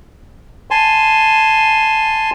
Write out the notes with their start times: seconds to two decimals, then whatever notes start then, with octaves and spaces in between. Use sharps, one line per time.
0.71 G#5 A5 C6